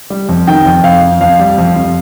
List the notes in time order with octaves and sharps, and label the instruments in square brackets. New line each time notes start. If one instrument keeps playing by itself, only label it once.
[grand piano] G3
F2
D#3 G5
F2
F2 F5
F2
F2 F5
G3
F2
F2